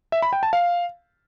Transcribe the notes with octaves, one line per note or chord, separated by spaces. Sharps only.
E5
B5
G5
A5
F5